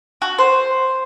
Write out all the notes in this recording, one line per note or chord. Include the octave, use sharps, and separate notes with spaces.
F#4
C5